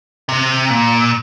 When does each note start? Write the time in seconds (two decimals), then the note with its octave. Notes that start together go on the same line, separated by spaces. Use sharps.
0.29 C3
0.70 A#2